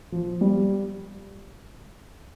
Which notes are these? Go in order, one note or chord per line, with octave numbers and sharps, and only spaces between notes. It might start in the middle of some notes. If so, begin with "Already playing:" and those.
F3
G3